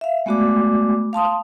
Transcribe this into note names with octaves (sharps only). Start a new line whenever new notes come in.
E5 F5
G#3 A3 B3 F#4 D5 D6
F5 A5 C6 D#6